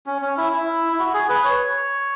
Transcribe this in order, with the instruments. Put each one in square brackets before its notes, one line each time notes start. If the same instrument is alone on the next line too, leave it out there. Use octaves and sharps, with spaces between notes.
[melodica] C#4
C#4
E4
E4
E4
F#4
G#4
B4
C#5